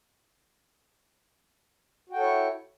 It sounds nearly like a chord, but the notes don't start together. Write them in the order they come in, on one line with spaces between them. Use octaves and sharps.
F#4 G5 A4 C#5 E4